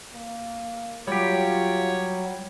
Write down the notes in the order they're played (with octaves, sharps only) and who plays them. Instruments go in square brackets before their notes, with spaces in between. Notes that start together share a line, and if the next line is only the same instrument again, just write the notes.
[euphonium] A#3
[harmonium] F#3 [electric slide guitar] G3 G4 [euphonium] F4 [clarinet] C#5